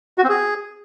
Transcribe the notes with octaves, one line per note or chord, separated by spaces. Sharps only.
F#4
C4
G#4